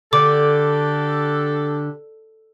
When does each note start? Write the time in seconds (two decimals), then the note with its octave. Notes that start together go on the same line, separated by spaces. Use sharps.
0.13 D3 D4 G4 A4 D6